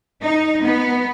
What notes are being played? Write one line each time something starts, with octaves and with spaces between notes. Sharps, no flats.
D#4
B3